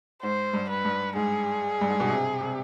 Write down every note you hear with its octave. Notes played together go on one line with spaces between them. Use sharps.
G#2 C5
G2
B4
G2
G#2 G#4
G2
G#2
B2
C3
C3